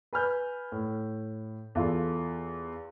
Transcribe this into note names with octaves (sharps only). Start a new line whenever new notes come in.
B4 G#5 B5 F6 G6
A2
E2 F4 A4